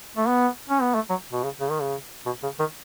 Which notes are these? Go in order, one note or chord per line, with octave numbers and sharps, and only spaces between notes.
A3
B3
C#4
B3
A3
F#3
B2
C#3
C#3
D#3
C#3
B2
C#3
D#3